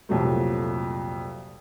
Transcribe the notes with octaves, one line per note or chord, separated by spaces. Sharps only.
C2 F2 A#2 F#3 A3